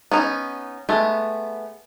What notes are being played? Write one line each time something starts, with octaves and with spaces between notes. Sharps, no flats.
B3 C#4 D#4
G#3 A3 B3